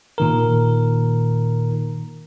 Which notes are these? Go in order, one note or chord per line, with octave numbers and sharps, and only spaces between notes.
A#2 D#3 A#4